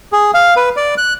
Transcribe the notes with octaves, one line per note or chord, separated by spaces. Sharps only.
G#4
F5
B4
D5
F#6